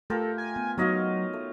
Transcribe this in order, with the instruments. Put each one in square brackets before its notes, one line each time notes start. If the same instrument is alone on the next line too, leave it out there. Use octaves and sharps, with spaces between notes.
[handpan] A3 [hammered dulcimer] F4 G4 A#4 [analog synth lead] A4
[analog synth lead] G#5
[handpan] B3
[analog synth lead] F#3 [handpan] B3 D#4 F#4 [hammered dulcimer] C#5 D#5 F5
[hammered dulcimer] A3